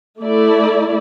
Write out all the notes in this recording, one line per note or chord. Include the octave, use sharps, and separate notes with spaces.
A3 E4 D5